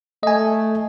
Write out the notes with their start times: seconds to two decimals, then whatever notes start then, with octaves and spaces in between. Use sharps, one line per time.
0.23 A3 D#5 G#5